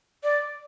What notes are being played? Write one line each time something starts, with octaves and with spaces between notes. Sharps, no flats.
D5